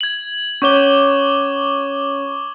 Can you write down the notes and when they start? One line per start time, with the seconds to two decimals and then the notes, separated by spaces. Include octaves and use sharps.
0.01 G#6 F#7
0.62 C#4 C#5 C#6 D6 G7